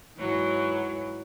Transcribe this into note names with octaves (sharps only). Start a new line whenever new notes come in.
G#2 E3 F#3